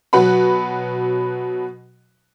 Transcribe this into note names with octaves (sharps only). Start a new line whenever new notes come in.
B2 F#3 F#4 B4 F#5 B5